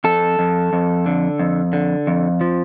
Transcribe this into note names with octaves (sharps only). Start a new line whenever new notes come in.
F2 A4
F2
F2
D3
F2
D3
F2
F3